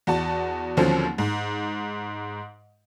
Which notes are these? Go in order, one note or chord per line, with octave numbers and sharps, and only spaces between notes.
E2 F#4 A5
D#2 D3 F3 F#3 C4 C#4
G#2